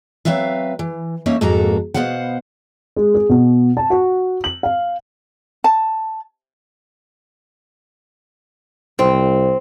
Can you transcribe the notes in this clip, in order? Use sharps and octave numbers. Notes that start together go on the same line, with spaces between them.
F#3 G#3 C4 B4 E5 F5
E3
A3 A#3 C#4 D#4 D#5 E5
F2 G#2 A#3 F#4 A4 A#5
B2 A3 B3 C5 F5 F#5
G#3
G#4
B2
A5
F#4
F#7
F5
A5
C2 C4